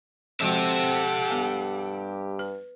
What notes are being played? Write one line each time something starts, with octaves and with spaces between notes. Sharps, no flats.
F3 G#3 C4 F#4 G4 A4 E5 F#5
G2 B3 F5 G#5
B4